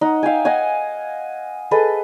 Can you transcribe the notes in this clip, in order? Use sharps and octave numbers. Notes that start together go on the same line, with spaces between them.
D#4 F#5
E5 F5 G5 G#5
D#5 F5 F#5 G#5
G#4 A4 B4 D#5